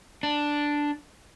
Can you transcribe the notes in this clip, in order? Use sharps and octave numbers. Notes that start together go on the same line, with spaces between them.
D4